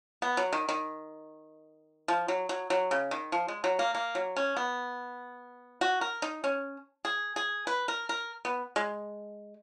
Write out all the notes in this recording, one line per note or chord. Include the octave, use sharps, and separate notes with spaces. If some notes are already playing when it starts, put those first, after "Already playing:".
B3
F#3
D#3
D#3
F3
F#3
F#3
F#3
C#3
D#3
F3
G#3
F#3
A#3
A#3
F#3
C#4
B3
F#4
A#4
D#4
C#4
G#4
G#4
B4
A#4
A#4
B3
G#3